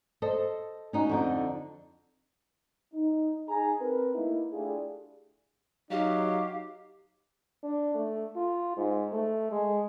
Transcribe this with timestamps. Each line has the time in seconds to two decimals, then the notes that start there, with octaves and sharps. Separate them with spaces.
0.22 A4 C5 D#5
0.93 C#4 D#4 F#4
1.09 F2 D3 D#4
2.94 D#4
3.49 D#4 G#4 A#5
3.80 C4 A#4 B4
4.15 A3 A#3 D#4 E4
4.52 A3 D4 E4 F4 G4 G#4
5.91 F#3 D#4 G4 F5
7.63 D4
7.95 A3
8.36 F4
8.77 G#2
9.13 A3
9.52 G#3